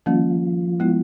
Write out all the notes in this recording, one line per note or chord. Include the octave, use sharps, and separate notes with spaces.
D#3 F3 G3 A#3 C#4
G#3 B3 E4